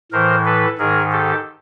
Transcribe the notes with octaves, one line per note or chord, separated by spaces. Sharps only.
A2 E3 A#4 C5
A4 B4
G#2 D#3 G#4 A#4
G4 A4